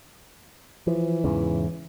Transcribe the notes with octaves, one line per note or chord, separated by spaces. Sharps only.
E3 F3
E2 G#2 C#3